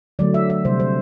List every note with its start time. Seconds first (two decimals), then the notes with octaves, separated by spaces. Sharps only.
0.19 D3 F#3 A3 D5
0.34 E5
0.50 E5
0.65 C3 G3 C5
0.80 C5